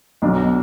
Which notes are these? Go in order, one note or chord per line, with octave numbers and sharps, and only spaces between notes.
B1 B2 F#3 D4